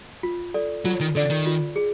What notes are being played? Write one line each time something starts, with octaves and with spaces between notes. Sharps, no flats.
F4
A4 D5
F#3 F4
D#3
D3 A4 D5
D#3
F4
G#4